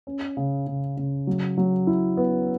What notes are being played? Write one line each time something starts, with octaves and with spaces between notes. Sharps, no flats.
C#4
C#3
C#3
C#3
F#3
F#3
E4
B3